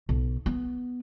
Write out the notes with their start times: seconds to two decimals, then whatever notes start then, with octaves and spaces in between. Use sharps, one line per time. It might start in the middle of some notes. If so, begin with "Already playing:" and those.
0.09 B1
0.46 B3